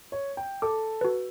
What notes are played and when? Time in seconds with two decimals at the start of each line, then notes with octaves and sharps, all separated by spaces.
0.12 C#5
0.37 G5
0.62 A4 D6
1.01 F#4 B4